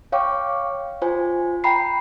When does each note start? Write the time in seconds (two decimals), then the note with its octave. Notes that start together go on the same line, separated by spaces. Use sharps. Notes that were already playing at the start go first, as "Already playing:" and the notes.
0.12 C#5 F5 G5 C#6 D6
1.02 F4 C5 G#5
1.64 G5 A#5 B5 C7